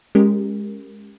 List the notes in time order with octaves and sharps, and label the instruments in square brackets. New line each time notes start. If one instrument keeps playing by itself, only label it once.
[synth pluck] G#3 C#4 G4 A#4